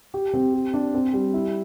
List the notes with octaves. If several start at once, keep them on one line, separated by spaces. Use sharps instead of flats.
G4
C4
G4
D4
C4
G3
E4